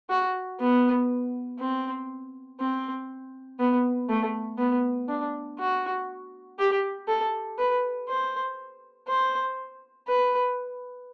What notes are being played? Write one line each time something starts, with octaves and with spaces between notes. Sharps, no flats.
F#4
B3
C4
C4
B3
A3
B3
D4
F#4
G4
A4
B4
C5
C5
B4